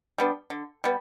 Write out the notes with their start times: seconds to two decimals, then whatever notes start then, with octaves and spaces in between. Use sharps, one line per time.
0.18 G3 B3 D4
0.50 D3
0.84 G3 B3